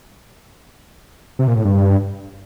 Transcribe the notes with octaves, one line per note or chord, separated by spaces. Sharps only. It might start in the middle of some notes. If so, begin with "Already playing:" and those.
C3
A#2
A2
G2